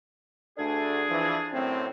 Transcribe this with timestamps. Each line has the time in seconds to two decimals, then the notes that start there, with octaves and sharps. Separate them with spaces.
0.57 D2 D4 G#4 A4
1.09 E3 F3
1.52 F#2 A2 C4